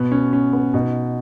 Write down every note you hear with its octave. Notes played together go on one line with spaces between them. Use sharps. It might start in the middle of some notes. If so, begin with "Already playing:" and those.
Already playing: B2 B3
C#4
C#4
B3
B2 D#4